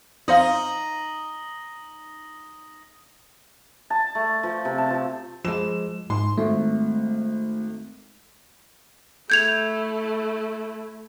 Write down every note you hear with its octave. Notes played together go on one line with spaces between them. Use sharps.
F2 D#4 C5 F5 D#6 A#6 G7
A5
A3
F3
C3
A5
F3
F3 G#3 E7
G#2 C6
G#1 A3
A3 E4 G6 G#6 F7